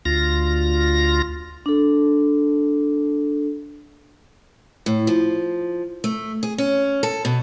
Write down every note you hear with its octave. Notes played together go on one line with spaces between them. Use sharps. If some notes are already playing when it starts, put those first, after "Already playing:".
D2 F4 A#6
D4 A4
A2
F3
A3
G#4
C#4
A4
B2